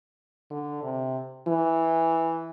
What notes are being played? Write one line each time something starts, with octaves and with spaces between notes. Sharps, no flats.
D3
C3
E3